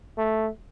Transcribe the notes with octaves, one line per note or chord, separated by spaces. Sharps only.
A3